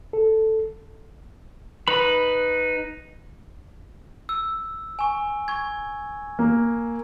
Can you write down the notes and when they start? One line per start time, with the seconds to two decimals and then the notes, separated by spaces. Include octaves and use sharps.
0.13 A4
1.88 D#4 B4 B5
4.29 E6
4.99 G#5 C#6
5.48 C#6 G#6
6.39 A#3